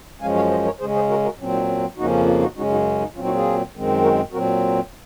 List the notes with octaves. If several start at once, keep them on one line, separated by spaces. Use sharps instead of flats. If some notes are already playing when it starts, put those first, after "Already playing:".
F#2 F3 G#3 C#4 F5 G#5
C#5 F5
C5 D#5
A#4 C#5
C#3 G#3 C#4 G#4 C5
G#4 C5
F#4 A#4
F#4 A#4
A#2 F#3 C4 C#4
D#4
C#4
F2 C#3 F3 A#3 C#4 D#4 F#4
C#4 F4
D#4 F#4
F#2 C#3 G#3 C#4 D#4 F#4
D#4 F#4
D#4
A#2 F#3 C4 C#4 F4
D#4 F#4
F4 G#4
F#2 D#3 G#3 C4
F#4 A#4
A#2 F#3 C4 F#4 A#4